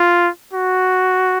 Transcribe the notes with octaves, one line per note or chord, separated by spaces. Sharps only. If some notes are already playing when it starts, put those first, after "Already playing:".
Already playing: F4
F#4